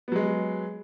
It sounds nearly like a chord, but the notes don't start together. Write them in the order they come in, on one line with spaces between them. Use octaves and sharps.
B3 F#3 G#3